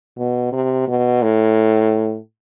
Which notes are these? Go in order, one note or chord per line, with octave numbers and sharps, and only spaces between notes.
B2
C3
B2
A2